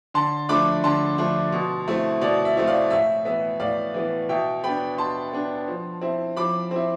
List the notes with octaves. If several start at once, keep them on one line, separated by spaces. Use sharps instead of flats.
D3 A5 C6
F3 A3 D4 B5 D6
D3 A5 C6
F3 A3 D4
B2
A3 C4 E4
B2 D5
E5
A3 C4 E4
D5 F5
A2 E5
E3 B3 E5
A2 D5 F5
E3 B3
B2 E5 G5
B3 D4 G5 B5
B2 A5 C6
B3 D4
F3
C4 E4
F3 B5 D6
C4 E4